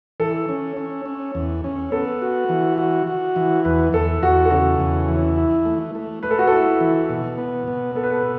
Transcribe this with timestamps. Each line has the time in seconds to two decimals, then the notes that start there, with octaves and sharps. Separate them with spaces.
0.20 E3 A4
0.49 C#4
0.77 C#4
1.06 C#4
1.35 E2
1.64 C#4
1.92 B3 A4
2.22 F#4
2.49 E3
2.78 F#4
3.07 F#4
3.36 E3
3.65 E2 B4
3.93 E2 A4
4.23 E2 F#4
4.45 A4
4.50 C#3 F#4
4.80 E2
5.09 E3
5.37 E4
5.65 A3
5.95 A3
6.23 A3 B4
6.31 A4
6.39 F#4
6.47 E4 A4
6.80 E3
7.10 B2
7.38 B3
7.67 B2
7.95 B3 A4
8.03 B4
8.10 A4